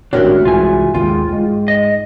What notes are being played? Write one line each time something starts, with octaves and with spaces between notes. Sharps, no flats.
G#1 A2 C#4 D4 F#4 G4 A#4 E5
C2 G#2 E3 F4 G#5
D#2 G#2 F4 G5
G#2 G#3
D#5